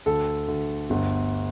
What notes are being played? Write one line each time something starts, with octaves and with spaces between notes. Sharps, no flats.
D2 A4
D2
G1